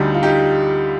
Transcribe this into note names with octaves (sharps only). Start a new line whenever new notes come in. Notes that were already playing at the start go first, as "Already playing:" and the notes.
Already playing: D2 D3 G3 D#4 G4
F4
D#4 G4